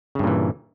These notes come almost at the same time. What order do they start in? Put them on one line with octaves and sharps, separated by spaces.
C#3 G2 A#2 E3